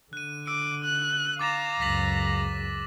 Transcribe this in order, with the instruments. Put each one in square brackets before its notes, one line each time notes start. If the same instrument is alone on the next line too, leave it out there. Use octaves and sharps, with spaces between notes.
[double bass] D3 [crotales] F#6 D#7
[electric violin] D6 [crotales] E6
[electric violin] F#6
[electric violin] F5 A#5 [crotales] D6 A6 E7
[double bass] C#2 F#2 [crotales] A#6 B6 F#7